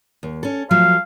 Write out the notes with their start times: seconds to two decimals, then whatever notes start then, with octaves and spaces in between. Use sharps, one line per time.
0.23 D#2
0.43 C#4 A4
0.71 F3 F#3 A3 F5